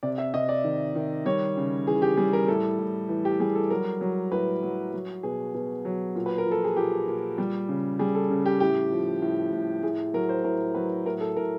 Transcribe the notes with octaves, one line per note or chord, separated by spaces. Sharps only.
C3 D5
E5
C3 D#5
D5
D#3
D#3
G3 C#5
C#3
E3 G#4
G4
G3 G#4
A#4
A2 A4
A2
E3
G4
G3 G#4
A4
F#3 A#4
F#3
A2 B4
F#3
F#3
B2 G#4
B2
F#3
A#2
B4
A#4
F3
A4
G#4
A#2 G4
A#2
G3
C#3
G3 G#4
A4
C#3
G4
A2 G4
F3
A2
A2
A2 G#4
F#3 A#4
C5
A2 A#4
F#3 B4
A2 A#4
A4
A2 A#4